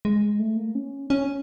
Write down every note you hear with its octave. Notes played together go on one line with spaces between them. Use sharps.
G#3
A3
A#3
C#4
C#4